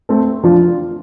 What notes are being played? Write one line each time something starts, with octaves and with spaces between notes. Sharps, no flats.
A3 C4 A4
F3 D4 F4